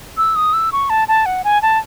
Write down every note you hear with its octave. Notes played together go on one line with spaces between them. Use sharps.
E6
D#6
E6
C#6
A5
A5
F#5
G#5
A5